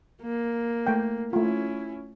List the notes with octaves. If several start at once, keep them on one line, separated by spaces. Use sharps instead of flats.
A#3
A3 G5
A3 C#4 E4 F4